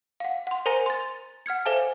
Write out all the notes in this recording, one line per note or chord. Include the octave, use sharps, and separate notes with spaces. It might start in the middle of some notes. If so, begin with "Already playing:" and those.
F5 F#5
F#5 C6
A#4 C5 G#5 A#5 A#6 D#7
C6 A6
F#5 F6 G#6 C#7
A4 C5 E5 F5 G#5 A5